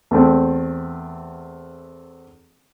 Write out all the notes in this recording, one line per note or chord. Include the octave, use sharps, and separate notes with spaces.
E2 A3 C4